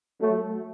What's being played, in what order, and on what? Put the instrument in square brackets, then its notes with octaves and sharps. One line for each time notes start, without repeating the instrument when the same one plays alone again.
[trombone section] F#3 A3